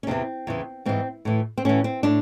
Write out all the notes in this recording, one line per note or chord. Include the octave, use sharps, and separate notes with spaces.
C#4
E2 C3 E3 C4
E2 C#3 E3
G#2 E3 C4
A2 E3
C4
A2 E3 C#4
C4
A2 D4